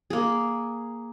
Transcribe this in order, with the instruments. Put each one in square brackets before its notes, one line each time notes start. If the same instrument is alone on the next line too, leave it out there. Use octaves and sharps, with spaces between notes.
[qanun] A#3 G#4